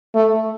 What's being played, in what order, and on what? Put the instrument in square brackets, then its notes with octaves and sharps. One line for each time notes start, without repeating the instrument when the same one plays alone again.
[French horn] A3